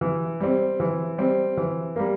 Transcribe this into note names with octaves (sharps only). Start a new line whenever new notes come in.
E3
G3 C4
E3
G3 C4
E3
G3 A#3